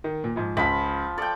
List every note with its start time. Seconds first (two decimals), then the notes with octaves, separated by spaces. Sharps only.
0.04 D#3
0.24 A#2
0.36 G#2 F3
0.57 C#2 F3 B5
1.18 A4 D5 G5